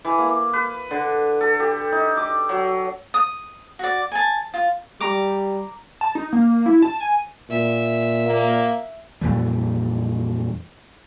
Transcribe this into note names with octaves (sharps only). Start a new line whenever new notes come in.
E3
A#3
B4
D3
A4
G4
D#4
D6
F#3
D#6
F#4 D5
G#5 A5
F4
G3 A#5 D6
A5
D#4
A#3
E4
A5
G#5
A#2 E5
A#3
F2 A#2 E3 G3